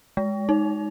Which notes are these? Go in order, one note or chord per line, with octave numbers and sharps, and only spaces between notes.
G#3
D#4